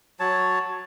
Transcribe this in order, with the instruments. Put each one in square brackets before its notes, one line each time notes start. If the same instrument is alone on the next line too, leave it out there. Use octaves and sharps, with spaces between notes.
[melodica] F#3 C#5 A5